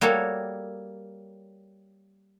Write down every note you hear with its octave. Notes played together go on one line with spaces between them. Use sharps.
G3 A#3 F#4 A4 C#5